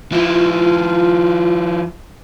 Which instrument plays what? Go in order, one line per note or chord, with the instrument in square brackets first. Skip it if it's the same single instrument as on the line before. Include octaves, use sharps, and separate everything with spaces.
[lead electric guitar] F3 E4 [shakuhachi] F4